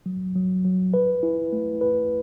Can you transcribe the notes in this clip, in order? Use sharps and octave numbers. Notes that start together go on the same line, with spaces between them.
F#3
F#3
F#3
B4
E4
A3
B4